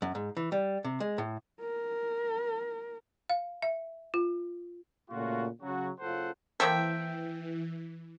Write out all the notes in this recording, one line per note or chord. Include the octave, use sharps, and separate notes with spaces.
F#2
G#2
E3
G3
C3
G#3
A2
A#4
F5
E5
F4
A#2 C#3 A3 F4 F#4
C#3 F#3 F#4
F#1 C#3 F4 A4 C5 F#5
E3 A#3 C4 A4 E5 G5